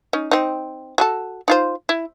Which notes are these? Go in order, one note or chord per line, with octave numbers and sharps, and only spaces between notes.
C#4 D#4
C4 D#4
F#4 G#4 A4
D#4 F4 C5
E4